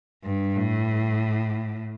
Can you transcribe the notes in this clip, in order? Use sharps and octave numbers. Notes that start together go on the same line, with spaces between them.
G2
A2